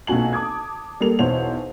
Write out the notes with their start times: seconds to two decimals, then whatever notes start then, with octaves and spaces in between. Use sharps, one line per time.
0.07 B1 A#2 C4 F#4 G#5 F#7
0.33 A5 D6 D#6 G#6
1.00 G3 A#3 A4 F7
1.19 B1 E2 C5 C#5 F#5 F7